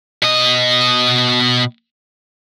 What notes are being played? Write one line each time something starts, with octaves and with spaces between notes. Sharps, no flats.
B2 D#5